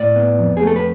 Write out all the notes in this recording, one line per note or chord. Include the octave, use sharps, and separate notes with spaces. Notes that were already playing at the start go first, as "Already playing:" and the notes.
Already playing: A2 D5
B3
F2
G#4
A3 A4
B4